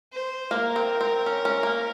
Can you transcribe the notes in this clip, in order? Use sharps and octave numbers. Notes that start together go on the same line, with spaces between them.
C5
A#3 A#4
C4
C4
C#4
C#4
A#3